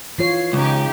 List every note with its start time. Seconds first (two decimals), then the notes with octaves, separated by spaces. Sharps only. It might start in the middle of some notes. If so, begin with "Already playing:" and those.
0.18 E3 F4 C#5 C7
0.53 C#2 C#3 D#4 G4